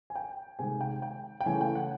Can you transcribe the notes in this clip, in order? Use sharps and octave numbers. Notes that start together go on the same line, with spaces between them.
G#5
G5
C3 D#3 G#3 G#5
G5
G5
G5
C#3 E3 A3 G#5
G5
F#5